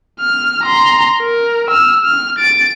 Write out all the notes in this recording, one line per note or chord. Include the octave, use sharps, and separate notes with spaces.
F6
A#5 C6
A#4
E6 F6
F6
A6 D7